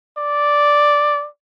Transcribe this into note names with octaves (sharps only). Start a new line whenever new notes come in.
D5